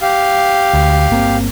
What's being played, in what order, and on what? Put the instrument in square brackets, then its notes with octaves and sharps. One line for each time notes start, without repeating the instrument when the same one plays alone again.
[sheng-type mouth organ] G4 F5
[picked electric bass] D2
G1 A#3 C4